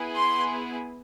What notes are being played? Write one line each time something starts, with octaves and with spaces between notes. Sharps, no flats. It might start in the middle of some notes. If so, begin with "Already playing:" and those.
Already playing: B3 E4 G#4
C6